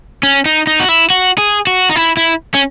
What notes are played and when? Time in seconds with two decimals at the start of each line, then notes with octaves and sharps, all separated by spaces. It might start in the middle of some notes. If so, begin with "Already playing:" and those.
0.23 C#4
0.46 D#4
0.67 D#4
0.80 F#4
0.89 E4
1.10 F#4
1.38 G#4
1.67 F#4
1.90 D#4
1.96 E4
2.17 E4
2.54 C#4